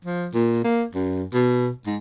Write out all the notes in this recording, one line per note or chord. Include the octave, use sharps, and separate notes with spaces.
F3
A#2
A#3
F#2
B2
G#2